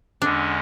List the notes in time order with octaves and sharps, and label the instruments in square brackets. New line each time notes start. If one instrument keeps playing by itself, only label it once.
[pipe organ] E2 D3 G#3 C#4 [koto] D4